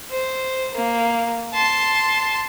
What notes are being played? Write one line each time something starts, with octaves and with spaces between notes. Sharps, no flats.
C5
A#3
A5 C6